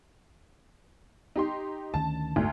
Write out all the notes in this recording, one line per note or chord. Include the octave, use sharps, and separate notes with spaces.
D#4 G4 C6
D2 D#3 C#4 A5
F#1 D2 G#2 A3